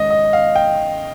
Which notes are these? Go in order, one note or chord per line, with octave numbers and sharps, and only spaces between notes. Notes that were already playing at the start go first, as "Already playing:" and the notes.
Already playing: G#2 D#3 G#3 C#4 D#5
D#5
F5
G5